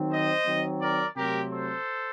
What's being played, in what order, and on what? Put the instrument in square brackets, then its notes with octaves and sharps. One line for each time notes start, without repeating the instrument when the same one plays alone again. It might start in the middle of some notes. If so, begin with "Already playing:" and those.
Already playing: [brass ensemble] D#3 F#3 C4
C5 D#5
D#3 F#3 C4
A#4 D5
C3 F#3 A3 C4 G4 A#4
A4 C5